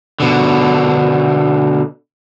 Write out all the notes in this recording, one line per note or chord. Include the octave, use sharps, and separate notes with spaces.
B2 D3